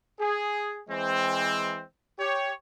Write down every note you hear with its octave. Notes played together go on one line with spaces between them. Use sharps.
G#4
E3 G#3 C4
G4 C#5